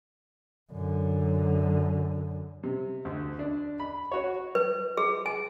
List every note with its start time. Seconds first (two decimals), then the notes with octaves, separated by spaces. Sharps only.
0.72 F#2 D3
2.63 C3
3.05 D2
3.39 D4
3.80 B5
4.12 F#4 C#5
4.55 B4
4.97 G#4
5.26 G#5